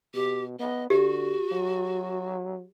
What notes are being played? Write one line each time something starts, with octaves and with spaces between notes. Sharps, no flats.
B2 G4
B3 D#5
D3 F#4 G4
F#3